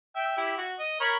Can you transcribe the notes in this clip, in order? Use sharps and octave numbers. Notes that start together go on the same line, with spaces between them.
E5 G5
E4 G4
F#4
D#5
A#4 C#5 B5